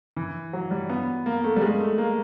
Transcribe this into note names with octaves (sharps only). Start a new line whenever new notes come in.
E3
F#3
G3
B3
A#3
A3
G3
G#3
A3
A#3